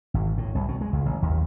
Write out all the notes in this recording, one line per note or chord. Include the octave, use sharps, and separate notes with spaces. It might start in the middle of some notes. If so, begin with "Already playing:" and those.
G#1
A2
C2
B2
G#3
C#2
A1
D#2